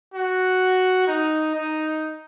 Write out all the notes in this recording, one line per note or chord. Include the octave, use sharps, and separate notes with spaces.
F#4
D#4
D#4